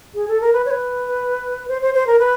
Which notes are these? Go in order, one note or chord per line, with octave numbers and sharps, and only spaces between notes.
G#4
A4
A#4
B4
C#5
B4
C5
C5
C5
A#4
B4